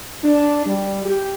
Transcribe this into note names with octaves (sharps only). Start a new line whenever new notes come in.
D4
G3
G4